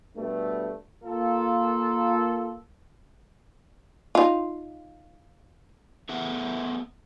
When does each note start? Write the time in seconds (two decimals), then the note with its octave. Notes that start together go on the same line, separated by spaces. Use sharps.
0.17 G2 B2 A3
1.05 A#3 F4 A4
4.15 D#4 F4
6.09 A3 B3 G#4 E5 F#5